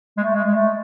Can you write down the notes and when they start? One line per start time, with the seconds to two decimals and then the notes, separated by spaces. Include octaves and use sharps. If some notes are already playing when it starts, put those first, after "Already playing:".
0.18 G#3
0.23 A3
0.34 G#3
0.44 G#3
0.55 A3